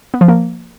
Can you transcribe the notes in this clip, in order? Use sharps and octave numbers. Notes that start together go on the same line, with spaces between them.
B3
F3
A#3